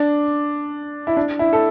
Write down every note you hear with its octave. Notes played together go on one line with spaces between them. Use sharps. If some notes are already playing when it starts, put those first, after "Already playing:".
Already playing: D4
E4
D4
E4
A4